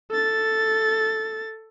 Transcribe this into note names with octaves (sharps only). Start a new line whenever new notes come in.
A4 A6